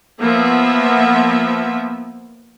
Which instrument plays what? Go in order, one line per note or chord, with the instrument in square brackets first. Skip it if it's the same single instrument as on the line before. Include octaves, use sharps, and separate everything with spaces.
[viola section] F3 A#3 B3 E5